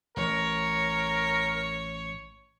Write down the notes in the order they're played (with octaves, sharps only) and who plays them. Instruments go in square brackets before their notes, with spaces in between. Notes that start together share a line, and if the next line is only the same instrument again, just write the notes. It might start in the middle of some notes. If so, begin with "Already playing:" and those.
[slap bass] A1 [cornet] A#4 [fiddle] C#5